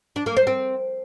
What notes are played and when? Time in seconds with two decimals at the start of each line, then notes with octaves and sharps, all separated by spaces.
0.16 D4
0.26 A#3
0.37 C5
0.47 C4